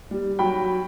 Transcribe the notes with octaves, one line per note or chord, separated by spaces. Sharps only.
G3
F#3 G5 B5